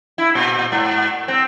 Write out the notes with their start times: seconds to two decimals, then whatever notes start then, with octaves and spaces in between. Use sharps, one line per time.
0.18 E4
0.35 A#2
0.72 G#2
1.28 C4